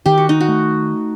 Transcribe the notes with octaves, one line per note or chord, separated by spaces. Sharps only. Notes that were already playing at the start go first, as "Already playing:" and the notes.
D#3 G4
F#4
D#4
F#4
A3